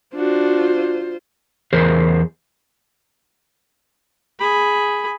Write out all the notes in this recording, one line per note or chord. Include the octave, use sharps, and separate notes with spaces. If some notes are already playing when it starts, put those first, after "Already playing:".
D4 F4 F#4 C5
E2 G#4 A#4 C5
G#4 B5